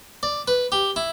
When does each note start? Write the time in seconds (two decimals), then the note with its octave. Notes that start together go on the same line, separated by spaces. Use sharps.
0.23 D5
0.48 B4
0.72 G4
0.96 E4